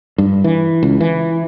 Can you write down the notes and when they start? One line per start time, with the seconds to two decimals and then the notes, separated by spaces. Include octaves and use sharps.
0.18 G2
0.44 E3
0.83 C#2
1.01 E3